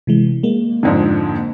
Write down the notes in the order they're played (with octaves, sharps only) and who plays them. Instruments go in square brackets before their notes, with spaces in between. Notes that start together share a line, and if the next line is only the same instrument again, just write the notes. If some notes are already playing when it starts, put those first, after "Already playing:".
[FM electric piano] C3 E3 G#3
G#3 A#3
[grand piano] F2 G#2 D3